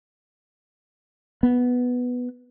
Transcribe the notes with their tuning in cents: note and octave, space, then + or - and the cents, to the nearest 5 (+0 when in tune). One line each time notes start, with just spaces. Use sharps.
B3 +0